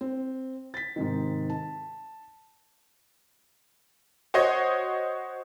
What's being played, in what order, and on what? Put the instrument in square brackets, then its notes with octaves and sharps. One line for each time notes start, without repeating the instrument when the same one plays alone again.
[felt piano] C4
A6 B6
G#2 C3 D#3
A5
[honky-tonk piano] F#4 C5 C#5 D#5